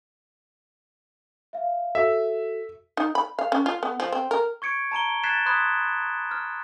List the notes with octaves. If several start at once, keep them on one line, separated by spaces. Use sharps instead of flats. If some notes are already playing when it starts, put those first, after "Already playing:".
E5 F5
F#4 A4 E5
D#4
B5
F5
C#4
F4
B3
F3
C4
A#4
C#6 G#6 C#7 D7
A5 A#5 D7 G7
F#6 G#6 A6 B6 C7 E7
B5 C6 D#6 F#6 G#6 B6
F6